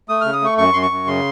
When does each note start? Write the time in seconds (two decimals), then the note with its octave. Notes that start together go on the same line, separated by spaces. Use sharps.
0.09 A3 D#6
0.21 C#3 F6
0.33 D#6
0.42 A3 C#6
0.58 F#2 C#6
0.73 F#2 C6
0.82 C#6
0.91 F#2
1.07 C#3 C6